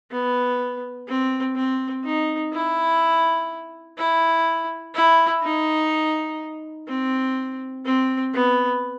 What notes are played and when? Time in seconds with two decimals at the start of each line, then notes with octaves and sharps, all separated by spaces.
0.11 B3
1.08 C4
1.55 C4
2.04 D#4
2.53 E4
3.97 E4
4.94 E4
5.43 D#4
6.88 C4
7.85 C4
8.33 B3